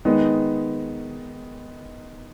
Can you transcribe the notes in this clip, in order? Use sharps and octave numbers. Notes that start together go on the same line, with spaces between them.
D#3 G#3 B3 D#4